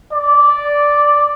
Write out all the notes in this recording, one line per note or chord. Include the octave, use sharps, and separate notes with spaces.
D5